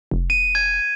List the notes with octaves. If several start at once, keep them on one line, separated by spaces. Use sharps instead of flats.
F1
D#7
G#6